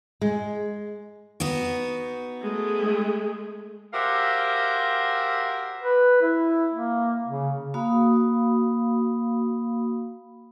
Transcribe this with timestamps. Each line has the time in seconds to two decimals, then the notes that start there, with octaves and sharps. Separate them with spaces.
0.21 G#3
1.40 B3 D#4 F#4
2.42 G#3 A3
3.93 F#4 G4 A#4 C5 E5 F5
5.82 B4
6.22 E4
6.73 A#3
7.28 C#3
7.74 A#3 F#4 F5 B5 D#6